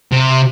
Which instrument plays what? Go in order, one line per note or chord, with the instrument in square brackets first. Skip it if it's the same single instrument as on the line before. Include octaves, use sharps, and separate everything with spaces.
[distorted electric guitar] C3